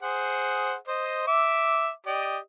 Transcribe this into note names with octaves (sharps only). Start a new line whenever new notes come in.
G#4 C5 F#5
C5 D#5
E5 D6
G4 D5 D#5